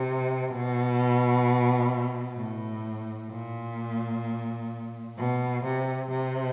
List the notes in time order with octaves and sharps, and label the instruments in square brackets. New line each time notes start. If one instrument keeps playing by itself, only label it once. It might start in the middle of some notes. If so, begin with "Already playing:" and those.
Already playing: [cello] C3
B2
A2
A#2
B2
C3
C3